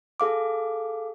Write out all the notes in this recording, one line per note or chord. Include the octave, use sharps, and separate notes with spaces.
G#4 A4 F5 D6